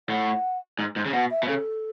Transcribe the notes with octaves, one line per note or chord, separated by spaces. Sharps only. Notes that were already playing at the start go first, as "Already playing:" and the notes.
A2 F#5
G#2
G#2
C#3
B2 F#5
E5
B2
C#3 A4